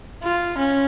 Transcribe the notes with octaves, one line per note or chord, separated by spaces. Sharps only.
F4
C#4